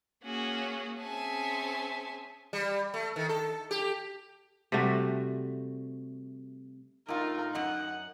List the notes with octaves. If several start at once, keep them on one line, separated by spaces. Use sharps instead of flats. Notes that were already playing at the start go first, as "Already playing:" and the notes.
A#3 C#4 F#4 G#4
C4 C#4 G#4 E5 G#5 A5
G3
A3
D#3
A4
G4
C3 G3 A3 F#4
A2 D#4 F4 A#4
F#2 D#5 F#5